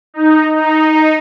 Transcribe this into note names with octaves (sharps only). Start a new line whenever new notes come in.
D#4
D#4